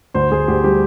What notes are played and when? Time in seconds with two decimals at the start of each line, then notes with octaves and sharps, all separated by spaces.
0.14 D2 C5
0.31 D2 G#4
0.48 D2 G4
0.64 G3 G4